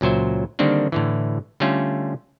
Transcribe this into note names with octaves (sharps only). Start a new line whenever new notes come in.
C#2 A#2 F#3 C5 E5
D3 D#3 G3 A#3 C4 D4
A2 D3 E3
D3 G3 A3 C#4 F4